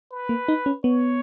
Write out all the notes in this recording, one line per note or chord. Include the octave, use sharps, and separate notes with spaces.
B4
A#3
D#4
C#4
B3 C#5